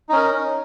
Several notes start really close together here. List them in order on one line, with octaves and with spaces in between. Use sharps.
D#4 C#4 A#4